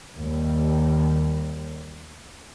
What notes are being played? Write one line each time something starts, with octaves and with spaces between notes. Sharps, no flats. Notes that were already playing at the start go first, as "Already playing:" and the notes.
D#2 G3